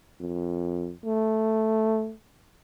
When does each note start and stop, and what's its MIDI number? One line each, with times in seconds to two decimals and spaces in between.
0.20 0.91 41
1.04 2.13 57